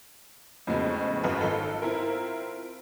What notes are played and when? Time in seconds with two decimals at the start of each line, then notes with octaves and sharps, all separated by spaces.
0.67 F2 A2 C#3 F#3 G#3 B3
1.24 G#1 F#2 F4 B4
1.41 G#1 D#4 F4 A4
1.82 C4 E4 F4 A#4